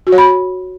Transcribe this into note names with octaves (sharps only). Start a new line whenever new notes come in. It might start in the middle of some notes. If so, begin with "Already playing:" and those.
F#4
C#5
B5